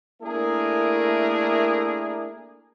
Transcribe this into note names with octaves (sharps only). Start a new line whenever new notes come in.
A3 A#3 D4 E4 G#4 A#4